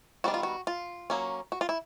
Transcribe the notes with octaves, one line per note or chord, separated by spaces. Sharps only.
D#3 G3 B3 D4 F#4
F4
F#4
F4
F#3 A#3 C#4
F#4
F4
E4